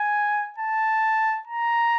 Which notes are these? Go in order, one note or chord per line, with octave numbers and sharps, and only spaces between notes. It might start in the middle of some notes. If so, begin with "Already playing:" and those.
Already playing: G#5
A5
A#5